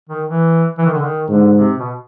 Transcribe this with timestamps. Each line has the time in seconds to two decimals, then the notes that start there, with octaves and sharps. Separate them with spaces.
0.09 D#3
0.26 E3
0.78 E3
0.86 D#3
0.94 D3
1.02 D#3
1.29 G#2 D3
1.55 C3
1.79 B2